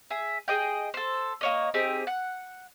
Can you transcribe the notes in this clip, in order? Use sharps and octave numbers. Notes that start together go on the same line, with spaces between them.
G#4 E5
G#4 D#5 G5
A4 C5
A#3 C#5 D#5
C4 D#4 G4 G#4
F#5